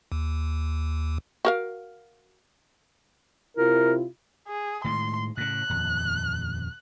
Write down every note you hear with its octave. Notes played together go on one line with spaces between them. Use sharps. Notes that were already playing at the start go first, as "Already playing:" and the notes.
D#2
F#4 A#4 F5
C3 E4 F4 A#4
G#4
A2 D#3 G#3 C6
A2 C#3 F#6
D#1 F2